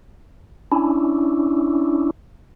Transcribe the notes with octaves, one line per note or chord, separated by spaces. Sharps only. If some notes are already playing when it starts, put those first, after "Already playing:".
C#4 D4 E4